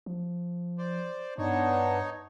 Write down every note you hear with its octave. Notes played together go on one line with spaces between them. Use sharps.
F3
C5 D5
G2 B3 D4 D#4 C#5